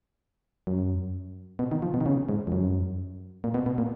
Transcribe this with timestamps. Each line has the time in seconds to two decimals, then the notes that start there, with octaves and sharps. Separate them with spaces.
0.67 F#2
1.59 B2
1.71 D#3
1.82 F3
1.94 B2
2.01 D#3
2.06 C#3
2.29 G#2
2.47 F2
2.52 F#2
3.44 A#2
3.54 B2
3.66 B2
3.78 A#2